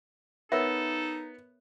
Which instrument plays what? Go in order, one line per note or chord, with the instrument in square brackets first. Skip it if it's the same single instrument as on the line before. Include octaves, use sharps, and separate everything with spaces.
[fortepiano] B3 [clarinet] D#4 [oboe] A4 [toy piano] A#4 C#5 E5